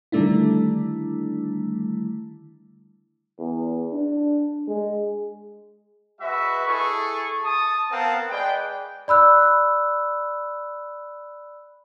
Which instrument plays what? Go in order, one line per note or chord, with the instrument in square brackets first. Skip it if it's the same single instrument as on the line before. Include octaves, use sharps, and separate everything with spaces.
[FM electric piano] D3 D#3 G3 A3 D4 E4
[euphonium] E2
D4
G#3
[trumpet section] G#3 F#4 B4 E5
E4 G#4 A4 C#6
A5 D#6
B3 C4 A#4 F5 F#5 A5
G#3 B4 D5 G5
[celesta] D5 B5 E6 F#6